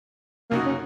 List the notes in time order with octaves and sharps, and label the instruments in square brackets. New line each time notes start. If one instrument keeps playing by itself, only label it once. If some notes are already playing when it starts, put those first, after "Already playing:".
[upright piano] F#2 C#3 F#3 D#4 F#4 [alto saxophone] A#3
[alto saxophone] C#4